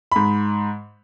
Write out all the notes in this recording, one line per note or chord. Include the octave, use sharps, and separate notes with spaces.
G#2 B5